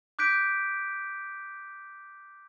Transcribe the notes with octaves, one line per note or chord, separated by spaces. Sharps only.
D6 F#6 G6 B6 D7